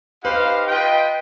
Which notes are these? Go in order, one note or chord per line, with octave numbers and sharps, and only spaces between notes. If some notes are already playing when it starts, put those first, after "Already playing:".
D#4 G4 B4 C5 F5
F4 B4 D#5 G5